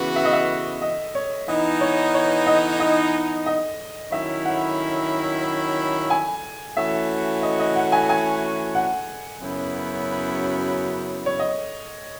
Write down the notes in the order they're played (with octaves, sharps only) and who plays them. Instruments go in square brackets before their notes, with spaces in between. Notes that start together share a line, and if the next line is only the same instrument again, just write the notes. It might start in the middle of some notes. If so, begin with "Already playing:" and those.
Already playing: [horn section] C#3 E3 B3 F#4
[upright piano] E5
D#5
E5
D#5
C#5
[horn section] E3 B3 D#4 [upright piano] D#5
[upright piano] C#5
C#5
D#5
D#5
D#5
[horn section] D#3 F#3 C#4 E4 [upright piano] E5
[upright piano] F#5
G#5
[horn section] E3 A3 C#4 F#4 [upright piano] E5
[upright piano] D#5
D#5
F#5
G#5
G#5
F#5
[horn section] F#2 C#3 F#3 B3 E4
[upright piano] C#5
D#5